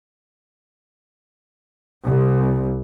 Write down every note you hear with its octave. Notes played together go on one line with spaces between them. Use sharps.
C2